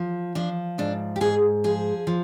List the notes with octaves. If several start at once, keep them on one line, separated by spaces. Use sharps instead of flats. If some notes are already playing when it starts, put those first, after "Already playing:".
Already playing: F3
F3 D4
G#2 D4
G4
G#2 G#4
F3 G#4
F3